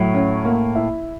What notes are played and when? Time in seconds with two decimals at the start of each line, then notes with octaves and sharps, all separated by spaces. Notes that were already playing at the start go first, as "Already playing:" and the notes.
Already playing: A2 F#3
0.14 C#4
0.45 A#3
0.75 E4